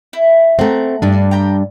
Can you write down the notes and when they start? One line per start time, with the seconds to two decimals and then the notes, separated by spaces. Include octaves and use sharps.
0.13 E4
0.59 A3 C4 F#5 A#5
1.02 G2 D4
1.31 G5 A#5 B5